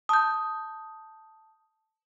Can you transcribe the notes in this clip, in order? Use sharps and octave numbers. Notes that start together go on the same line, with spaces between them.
A5 D#6 G6